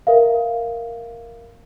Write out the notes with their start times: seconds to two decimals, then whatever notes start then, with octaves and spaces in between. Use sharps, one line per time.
0.07 A#4 E5 F5